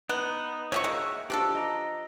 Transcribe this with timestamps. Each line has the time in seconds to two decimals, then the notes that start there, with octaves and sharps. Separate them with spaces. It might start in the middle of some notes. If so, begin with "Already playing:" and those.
0.09 B3 D#4 F#6
0.72 F3 G4 C#5 E5 C#6
0.84 G#3 A#3 F#4 E5
1.30 F3 D4 G4 A4
1.55 D#5 A#5